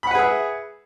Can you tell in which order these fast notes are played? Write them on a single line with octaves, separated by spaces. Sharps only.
B5 F#5 B4 G#4 E5